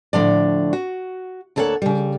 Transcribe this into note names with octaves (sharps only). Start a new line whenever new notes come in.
A2 D3 F3 D5
F#4
D2 A#3 A4 C#5 F5 F#5
C#3 G3